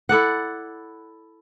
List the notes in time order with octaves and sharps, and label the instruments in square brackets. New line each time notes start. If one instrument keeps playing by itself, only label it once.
[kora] E4 A4 D5 F#5